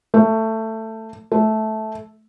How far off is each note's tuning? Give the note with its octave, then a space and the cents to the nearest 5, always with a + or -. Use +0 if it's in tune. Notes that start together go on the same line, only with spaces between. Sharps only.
A3 +15
A3 -10